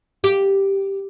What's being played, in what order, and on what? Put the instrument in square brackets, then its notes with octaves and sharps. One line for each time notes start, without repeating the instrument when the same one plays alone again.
[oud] G4